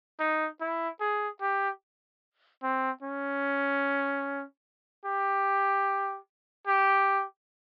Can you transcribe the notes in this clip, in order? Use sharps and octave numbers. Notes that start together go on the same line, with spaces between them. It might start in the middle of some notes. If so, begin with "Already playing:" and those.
D#4
E4
G#4
G4
C4
C#4
G4
G4